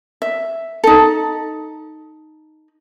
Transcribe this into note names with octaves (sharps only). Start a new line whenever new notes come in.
E5
D#4 A4